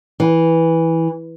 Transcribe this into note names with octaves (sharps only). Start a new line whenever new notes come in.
E3